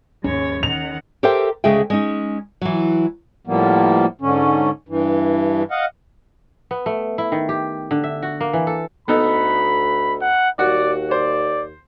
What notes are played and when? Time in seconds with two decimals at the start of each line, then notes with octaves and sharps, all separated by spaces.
0.24 D#2 G#2 C#4 C#5
0.63 D#3 F#5 F7
1.23 G4 A4 A#4 C5 E5 G5
1.64 D2 C#3 G#3 G#4 E5 G5
1.90 G#3 C#4 D#4
2.61 E3 F#3
3.47 A2 F3 G3 A#3 B3
4.21 G#2 D3 C#4
4.89 G2 E3
5.71 D#5 F5 F#5
6.71 B3
6.86 A3
7.18 E4
7.32 D#3
7.49 G4
7.91 D3
8.04 E5
8.23 F#4
8.41 A#3
8.53 E3
8.67 A4
9.08 D2 B3 D#4 A4 B5
10.21 F#5
10.59 D#2 F#4 D5 F#5
11.11 C5 D5